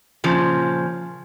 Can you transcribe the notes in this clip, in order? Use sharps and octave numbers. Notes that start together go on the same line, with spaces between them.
A#2 C#3 F3